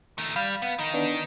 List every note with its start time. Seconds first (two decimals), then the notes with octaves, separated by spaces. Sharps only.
0.18 D#3 A3
0.36 G3 F5 B5
0.62 B3
0.78 D#3 D#4
0.94 B3 D4